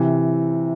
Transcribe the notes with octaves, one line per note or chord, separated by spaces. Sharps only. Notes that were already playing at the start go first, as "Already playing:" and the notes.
Already playing: C3 E3